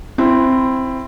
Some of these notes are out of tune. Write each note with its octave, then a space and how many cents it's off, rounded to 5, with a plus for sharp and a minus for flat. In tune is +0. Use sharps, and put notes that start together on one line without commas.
C4 +0 E4 +15